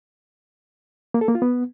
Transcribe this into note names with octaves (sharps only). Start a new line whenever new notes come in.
A#3
A4
A#3
F4
B3